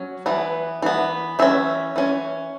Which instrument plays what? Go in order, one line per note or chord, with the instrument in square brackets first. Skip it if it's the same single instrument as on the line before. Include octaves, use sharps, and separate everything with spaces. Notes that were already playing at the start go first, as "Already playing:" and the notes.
Already playing: [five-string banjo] F#3 C#4
E3 B3
E3 B3
E3 C#4 E5
E3 C#4